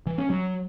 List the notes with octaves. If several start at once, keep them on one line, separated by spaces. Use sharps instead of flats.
E3
C#4
F#3